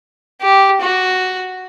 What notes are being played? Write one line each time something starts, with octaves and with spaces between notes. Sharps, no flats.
G4
F#4